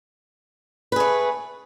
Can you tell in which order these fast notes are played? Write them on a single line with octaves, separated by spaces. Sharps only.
B4 G#4 A3